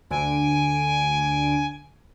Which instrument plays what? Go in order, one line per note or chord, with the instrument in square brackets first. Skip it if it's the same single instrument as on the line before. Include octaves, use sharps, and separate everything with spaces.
[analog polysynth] D2 D3 D7 [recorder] G#5